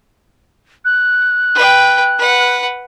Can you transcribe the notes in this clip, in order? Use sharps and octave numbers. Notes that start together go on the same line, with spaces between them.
F#6
B4 G5
B4 F#5